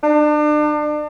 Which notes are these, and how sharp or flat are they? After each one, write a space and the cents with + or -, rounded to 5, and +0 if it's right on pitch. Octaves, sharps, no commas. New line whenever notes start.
D4 +35